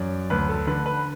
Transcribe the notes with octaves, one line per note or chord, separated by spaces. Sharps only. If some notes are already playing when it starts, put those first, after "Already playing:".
Already playing: F#2 D5
D2 B4
A4
D3 B4
B4